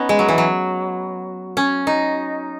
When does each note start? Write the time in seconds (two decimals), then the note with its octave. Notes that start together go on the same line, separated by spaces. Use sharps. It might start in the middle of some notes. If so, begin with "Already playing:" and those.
Already playing: B3 C#4 D#4
0.09 G#3
0.19 F#3
0.28 E3
0.38 F#3
1.57 C#4
1.87 D#4